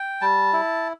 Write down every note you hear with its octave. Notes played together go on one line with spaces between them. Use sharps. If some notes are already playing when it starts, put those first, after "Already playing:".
Already playing: G5
G3 A5
E4